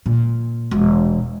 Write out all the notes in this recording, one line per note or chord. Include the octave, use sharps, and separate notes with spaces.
A#2
E1